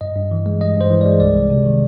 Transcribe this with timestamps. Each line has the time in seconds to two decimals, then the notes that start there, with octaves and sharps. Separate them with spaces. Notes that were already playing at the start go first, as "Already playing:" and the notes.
0.01 G2 D#5
0.15 G2
0.31 E3
0.46 G#3
0.60 G2 D#5
0.76 G2 C5
0.90 E3
1.01 G#3 D5
1.20 C2 D5
1.35 C2
1.50 C3
1.66 D#3